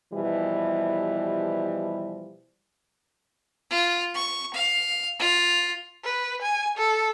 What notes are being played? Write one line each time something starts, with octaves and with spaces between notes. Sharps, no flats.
B2 E3 F3 G3
F4
C#6
F5
F4
B4
G#5
A4